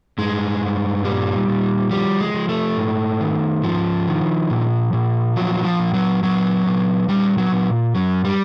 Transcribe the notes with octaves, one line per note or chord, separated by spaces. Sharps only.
G2 G#3
G2
A#2 G3
A#2
F3 G3
G#3
F3
A3
G#2
D#3
G#2 F3
D#3
A#2
A#2
F3 F#3
F3
A#2
F#3
A#2 F#3
A#2
A#2 G3
F#3
A#2
F#2 F#3
G3